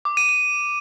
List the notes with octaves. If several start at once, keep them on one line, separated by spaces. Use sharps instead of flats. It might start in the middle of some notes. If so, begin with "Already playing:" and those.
D6
D#7
D#7